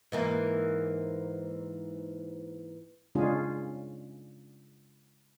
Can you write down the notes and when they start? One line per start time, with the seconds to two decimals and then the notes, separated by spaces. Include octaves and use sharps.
0.12 G#2 E3 A#3
3.15 C#3 G#3 C#4 D4 F4 G#4